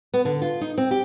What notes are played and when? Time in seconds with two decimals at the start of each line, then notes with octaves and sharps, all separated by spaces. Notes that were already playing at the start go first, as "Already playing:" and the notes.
0.14 B3
0.25 D3
0.42 F4
0.61 D#4
0.78 C4
0.91 G4